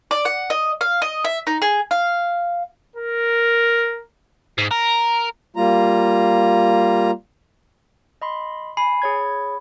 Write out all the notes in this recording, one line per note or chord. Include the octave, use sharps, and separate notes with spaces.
D5
F#5
D#5
F5
D#5
E5
D#4
G#4
F5
A#4
G#2
A#4
G3 A#3 F4 A#5
D#5 B5 C6
G#5 B5 C7
G#4 C#5 G#6